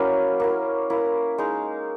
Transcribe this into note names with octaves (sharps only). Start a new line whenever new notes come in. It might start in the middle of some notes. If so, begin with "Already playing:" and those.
Already playing: F#3 A#3 C#4 E4
A#3 E4
A#3 E4
G#3 D#4